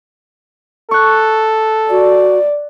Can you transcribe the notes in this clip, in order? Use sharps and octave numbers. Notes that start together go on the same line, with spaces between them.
A4 C#6 F#6
F#4 D5